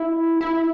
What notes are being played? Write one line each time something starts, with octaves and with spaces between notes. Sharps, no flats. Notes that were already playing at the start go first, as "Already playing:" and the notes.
Already playing: E4
E4